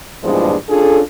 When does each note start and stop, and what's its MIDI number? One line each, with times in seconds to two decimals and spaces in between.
0.23 0.54 40
0.23 0.54 43
0.23 0.54 46
0.23 0.54 53
0.23 0.54 56
0.23 0.54 62
0.69 1.00 61
0.69 1.00 62
0.69 1.00 65
0.69 1.00 68
0.69 1.00 69